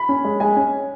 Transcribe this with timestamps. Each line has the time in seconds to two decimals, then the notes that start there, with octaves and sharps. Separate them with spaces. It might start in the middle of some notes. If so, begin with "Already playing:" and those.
Already playing: B5
0.09 C#4
0.24 G#3
0.40 G#3 G#5
0.56 C#4